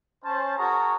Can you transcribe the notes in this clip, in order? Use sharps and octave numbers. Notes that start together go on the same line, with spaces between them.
C#4 C5 A5
F#4 G#4 A#4 C#5 A5 A#5